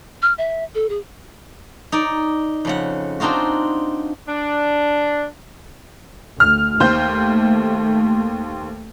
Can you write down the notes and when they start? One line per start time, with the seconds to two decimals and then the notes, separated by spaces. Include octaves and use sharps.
0.22 F6
0.38 E5
0.75 A4
0.89 G#4
1.92 D#4 D5
2.65 F2 C#3 F#5
3.20 C4 D4 D#4 F4 F#4
4.28 D4
6.40 D2 F6
6.80 D#2 A3 C5 G6